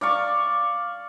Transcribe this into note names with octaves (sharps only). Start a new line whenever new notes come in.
D5 F5 C#6